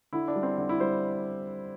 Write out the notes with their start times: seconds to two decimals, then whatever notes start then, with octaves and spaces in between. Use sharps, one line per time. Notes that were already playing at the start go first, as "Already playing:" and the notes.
0.13 D3 E4
0.28 D4
0.36 G3
0.43 C4
0.58 D3 D4
0.69 E4
0.80 G3 C5